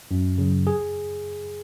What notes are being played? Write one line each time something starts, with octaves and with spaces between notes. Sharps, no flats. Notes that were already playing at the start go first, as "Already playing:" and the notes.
F#2
C#3 F#3
G#4